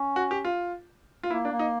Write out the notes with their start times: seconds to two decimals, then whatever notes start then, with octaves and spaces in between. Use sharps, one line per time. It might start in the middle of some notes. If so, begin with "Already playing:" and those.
Already playing: C#4
0.16 F#4
0.31 G4
0.45 F4
1.23 F4
1.30 A#3 E4
1.45 D4
1.52 A#3
1.59 D#4